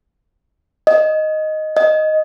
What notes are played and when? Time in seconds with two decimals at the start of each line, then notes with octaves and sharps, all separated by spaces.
0.87 D#5
1.77 D#5